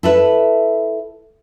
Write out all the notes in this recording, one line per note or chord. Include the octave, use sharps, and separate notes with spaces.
E4 A4 B4